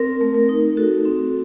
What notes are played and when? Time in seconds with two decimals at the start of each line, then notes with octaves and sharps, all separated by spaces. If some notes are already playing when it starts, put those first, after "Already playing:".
Already playing: C4 A#4
0.21 A3
0.34 A#4
0.49 D#4
0.77 F#4 A4
1.05 C4